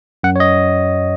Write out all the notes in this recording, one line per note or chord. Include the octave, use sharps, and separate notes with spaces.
F#2 F#5
C#5
D#5